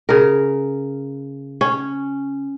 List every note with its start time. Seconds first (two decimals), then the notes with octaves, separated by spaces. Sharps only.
0.09 C#3 A#4
1.61 C#4